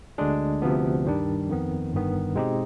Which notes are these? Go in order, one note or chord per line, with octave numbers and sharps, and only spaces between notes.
D2 D3 G#3 D4 G#4
D2 C3 F3 B3
G2 D#3 G3 D4
F2 D#3 B3
G1 G2 D#3 B3
B2 G#3 C4 D#4 G4